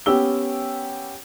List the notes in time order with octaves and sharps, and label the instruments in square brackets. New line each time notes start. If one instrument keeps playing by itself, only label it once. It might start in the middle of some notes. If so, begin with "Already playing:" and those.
[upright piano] B3 C#4 G4 E6 G7